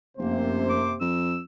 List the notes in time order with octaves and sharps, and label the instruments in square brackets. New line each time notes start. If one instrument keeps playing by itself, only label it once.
[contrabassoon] F1 [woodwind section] F#2 A#3 [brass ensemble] C3 C5
[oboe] D6
[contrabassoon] F2 [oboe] E6